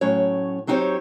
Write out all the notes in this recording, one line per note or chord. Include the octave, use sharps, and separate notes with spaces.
A2 F#3 C#4 C#5
F#3 C4 D#4 G4 C5 C#5